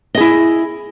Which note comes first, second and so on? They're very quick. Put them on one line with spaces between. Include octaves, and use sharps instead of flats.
D#5 G#4 E4